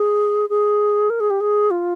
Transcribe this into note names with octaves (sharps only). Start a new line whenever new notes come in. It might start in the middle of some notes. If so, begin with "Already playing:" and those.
Already playing: G#4
G#4
A#4
G#4
G4
G#4
F4